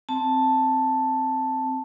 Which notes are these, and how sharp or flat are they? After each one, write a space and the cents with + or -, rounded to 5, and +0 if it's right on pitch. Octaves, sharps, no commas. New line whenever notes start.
C4 +0 A5 +0